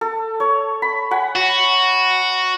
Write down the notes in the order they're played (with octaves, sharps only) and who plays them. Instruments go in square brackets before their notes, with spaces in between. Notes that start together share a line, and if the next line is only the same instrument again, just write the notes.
[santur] A4
C#5
B5
F#5 G#5 B5
[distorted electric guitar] F#4